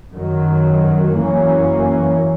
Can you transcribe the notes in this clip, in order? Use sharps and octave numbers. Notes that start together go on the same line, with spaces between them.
F#2 D#3 F#3
F#2 E3 A#3 C#4